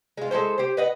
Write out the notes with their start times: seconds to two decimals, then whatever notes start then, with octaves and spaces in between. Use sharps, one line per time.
0.17 G#3 F4
0.31 G#3 E4 A4 C5
0.58 G4 C5
0.77 B4 D#5 F#5